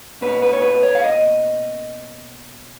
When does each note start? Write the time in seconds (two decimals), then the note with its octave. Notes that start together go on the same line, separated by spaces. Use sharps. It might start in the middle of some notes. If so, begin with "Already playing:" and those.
0.21 B2 A#3 C#4 B4
0.42 B4
0.53 C#5
0.62 B4
0.83 C#5
0.95 F5
1.04 D#5